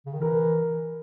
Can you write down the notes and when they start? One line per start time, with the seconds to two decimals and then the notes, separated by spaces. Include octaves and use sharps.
0.06 C#3
0.14 D#3
0.20 E3 A#4